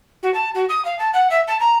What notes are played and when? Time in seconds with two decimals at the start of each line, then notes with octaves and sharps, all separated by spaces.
0.22 F#4
0.34 A5
0.54 F#4
0.68 D#6
0.84 F5
0.98 A5
1.13 F#5
1.29 E5
1.47 A5
1.59 A#5